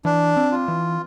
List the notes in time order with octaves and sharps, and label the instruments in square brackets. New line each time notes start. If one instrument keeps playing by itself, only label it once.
[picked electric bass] E3 [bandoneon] D4
[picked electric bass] C4
[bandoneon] F4
[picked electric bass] E3